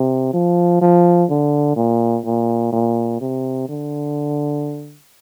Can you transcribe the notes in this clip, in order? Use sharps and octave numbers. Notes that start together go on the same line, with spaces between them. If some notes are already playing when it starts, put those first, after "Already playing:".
Already playing: C3
F3
F3
D3
A#2
A#2
A#2
C3
D3